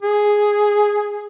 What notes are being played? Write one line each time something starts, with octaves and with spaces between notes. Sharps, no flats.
G#4